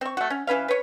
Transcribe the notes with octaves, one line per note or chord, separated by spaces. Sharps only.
C4 C#6
A3 F#4
C#4
E3 C#4 B4 F5
B4 C#5